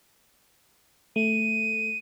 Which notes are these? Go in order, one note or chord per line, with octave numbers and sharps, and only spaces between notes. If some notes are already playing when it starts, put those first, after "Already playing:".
A3 D#7